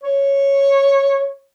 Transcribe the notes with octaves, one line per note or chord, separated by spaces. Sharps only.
C#5